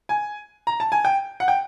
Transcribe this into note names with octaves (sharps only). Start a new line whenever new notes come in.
G#5
A#5
A5
G#5
G5
F#5
G5